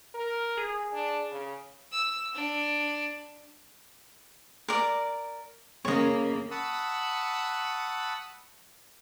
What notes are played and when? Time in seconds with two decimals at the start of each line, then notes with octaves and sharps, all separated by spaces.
0.15 A#4
0.57 G#4
0.93 D4
1.31 C#3
1.92 E6
2.35 D4
4.68 A#4 D5
5.85 C#3 A#3 C#5 D#5
6.51 F#5 A5 B5 C#6 D#6 E6